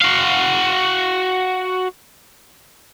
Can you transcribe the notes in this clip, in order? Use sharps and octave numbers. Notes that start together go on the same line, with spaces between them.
F#4 F5